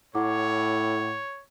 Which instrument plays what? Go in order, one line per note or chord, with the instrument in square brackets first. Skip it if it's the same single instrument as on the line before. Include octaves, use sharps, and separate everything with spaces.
[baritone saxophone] A2 [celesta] E4 F#5 D6 [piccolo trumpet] C#5